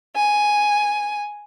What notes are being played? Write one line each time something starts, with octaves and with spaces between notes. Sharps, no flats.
G#5